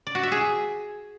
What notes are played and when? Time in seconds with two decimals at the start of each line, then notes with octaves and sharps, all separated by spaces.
0.07 D5
0.15 F#4
0.23 E5
0.32 G#4